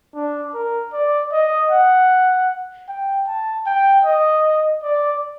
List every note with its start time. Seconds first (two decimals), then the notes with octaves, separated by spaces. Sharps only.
0.15 D4
0.54 A#4
0.93 D5
1.32 D#5
1.71 F#5
2.88 G5
3.27 A5
3.66 G5
4.05 D#5
4.83 D5